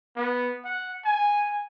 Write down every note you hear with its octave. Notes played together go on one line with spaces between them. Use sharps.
B3
F#5
G#5